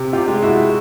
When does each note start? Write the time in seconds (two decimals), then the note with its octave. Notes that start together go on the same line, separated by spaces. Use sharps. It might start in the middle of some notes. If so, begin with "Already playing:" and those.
Already playing: C3
0.13 F4 G4
0.28 G#3
0.43 E4 F#4